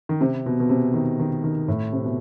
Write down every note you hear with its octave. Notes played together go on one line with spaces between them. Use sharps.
D#3
C3
B2
B2
C3
D#3
D#3
D#3
A2
C3
B2